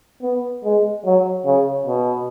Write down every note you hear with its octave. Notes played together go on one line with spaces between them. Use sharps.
B3
G#3
F#3
C#3
B2